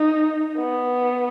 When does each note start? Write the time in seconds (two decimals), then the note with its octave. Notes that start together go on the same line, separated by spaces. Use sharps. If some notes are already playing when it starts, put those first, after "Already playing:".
Already playing: D#4
0.57 B3